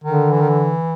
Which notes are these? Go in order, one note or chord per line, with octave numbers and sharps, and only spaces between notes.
D3 D#3
E3
D#3
E3